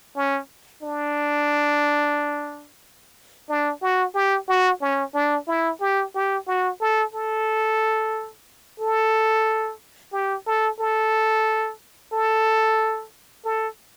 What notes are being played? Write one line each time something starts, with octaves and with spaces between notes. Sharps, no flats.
C#4
D4
D4
F#4
G4
F#4
C#4
D4
E4
G4
G4
F#4
A4
A4
A4
G4
A4
A4
A4
A4